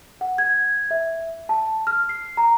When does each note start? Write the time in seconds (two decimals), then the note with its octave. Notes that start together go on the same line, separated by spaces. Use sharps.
0.21 F#5
0.38 G#6
0.91 E5
1.49 A5
1.87 F6
2.09 C7
2.37 A#5